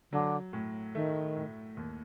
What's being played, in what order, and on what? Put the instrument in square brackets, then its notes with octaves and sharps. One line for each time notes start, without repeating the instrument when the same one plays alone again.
[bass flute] D3 [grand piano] F#3
[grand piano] A2
[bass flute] D#3 [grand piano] A3
[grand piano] A2
D#2